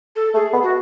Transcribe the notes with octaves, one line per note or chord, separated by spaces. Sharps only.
A4
A3 G#4
B3
F#4